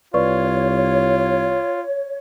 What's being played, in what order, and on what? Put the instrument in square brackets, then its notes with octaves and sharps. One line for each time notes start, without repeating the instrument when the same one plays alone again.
[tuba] C2 [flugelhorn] F4 [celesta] B4 D5 C#6 [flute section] C#5